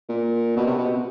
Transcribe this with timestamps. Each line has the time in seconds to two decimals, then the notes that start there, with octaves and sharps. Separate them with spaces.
0.09 A#2
0.57 B2
0.67 C3
0.78 B2